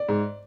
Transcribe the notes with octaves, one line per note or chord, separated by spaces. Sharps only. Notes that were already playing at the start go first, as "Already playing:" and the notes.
Already playing: D5
G#2